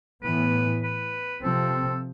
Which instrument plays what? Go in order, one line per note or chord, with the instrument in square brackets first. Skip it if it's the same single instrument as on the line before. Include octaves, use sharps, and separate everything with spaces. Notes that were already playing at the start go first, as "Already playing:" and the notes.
[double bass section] A2 E3 B3 [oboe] B4
[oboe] B4
[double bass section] C3 F3 C4 [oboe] A4